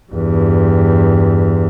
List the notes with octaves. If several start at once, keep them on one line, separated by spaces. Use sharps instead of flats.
E2 G2